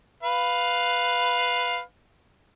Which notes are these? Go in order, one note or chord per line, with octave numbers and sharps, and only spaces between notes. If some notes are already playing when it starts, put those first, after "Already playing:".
B4 F5